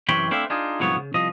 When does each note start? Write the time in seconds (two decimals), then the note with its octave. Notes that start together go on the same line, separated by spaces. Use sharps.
0.09 F#2 C3 E3 C#5 G5 B5
0.31 A3 C4 D4 E4 C5 F5
0.50 D4 D#4 F4 G#4
0.80 C2 G#2 F3 F#3 B3 C#5
0.96 C#3
1.14 C2 F3 D#5